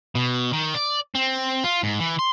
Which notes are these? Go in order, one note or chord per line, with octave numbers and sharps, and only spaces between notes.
B2
D#3
D5
C4
F4
G#2
E3
C6